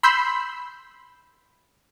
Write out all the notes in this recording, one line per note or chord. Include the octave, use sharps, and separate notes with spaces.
B5 C6 E6 G6 B6 C7